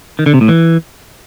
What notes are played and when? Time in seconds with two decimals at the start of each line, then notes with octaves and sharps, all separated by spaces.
0.19 D#3
0.26 D3
0.34 C3
0.41 A2
0.48 E3